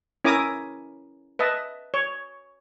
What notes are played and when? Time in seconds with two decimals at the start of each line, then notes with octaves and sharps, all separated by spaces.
0.24 C#4 E4 A#4 G#5 D6 D#6
1.39 B4 D#5 E5 A5
1.94 C#5